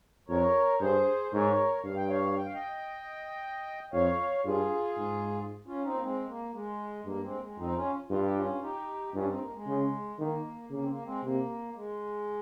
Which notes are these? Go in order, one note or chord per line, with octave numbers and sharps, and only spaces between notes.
F2 A#4 C#5
G2 G#4 C5
G#2 A#4 C#5
G2 F5
G5
C#5 F5
G5
F5
D#5 G5
F2 C#5 F5
G2 F4 G#4
G#2
C#4 F4
C4 D#4
A#3
G#3 C4
A#3
G#3
G2 A#3
G#3 C4
A#3
G#3
F2 C4 D#4
C#4 F4
G2 F4
G4
C#4 F4
D#4 G4
G2 C#4 F4
C4 D#4
A#3
G#3
C#3
D#3 A#3
C#3 A#3
C4
A#3
G#3 C4
C3 A#3
G#3